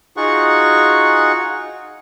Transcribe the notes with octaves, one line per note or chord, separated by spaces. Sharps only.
D#4 F4 F#4 G#4 F#5 C#6